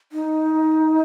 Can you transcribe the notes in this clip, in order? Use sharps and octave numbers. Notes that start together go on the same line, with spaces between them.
D#4